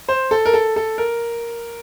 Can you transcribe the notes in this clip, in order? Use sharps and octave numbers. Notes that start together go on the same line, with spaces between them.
C5
A4
A#4
A4
A4
A#4